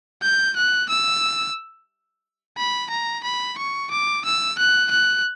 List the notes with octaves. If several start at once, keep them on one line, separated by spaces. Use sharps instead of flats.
G6
F#6
E6
B5
A#5
B5
C#6
D6
E6
F#6
F#6